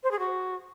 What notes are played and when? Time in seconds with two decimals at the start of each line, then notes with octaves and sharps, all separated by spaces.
0.03 C5
0.11 G#4
0.19 F#4